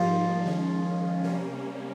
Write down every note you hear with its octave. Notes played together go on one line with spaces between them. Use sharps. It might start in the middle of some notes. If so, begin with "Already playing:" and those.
Already playing: G#2 F3 G3 A#3 D#4
D#3 G#3 C#4
C3 G3 A#3 C#4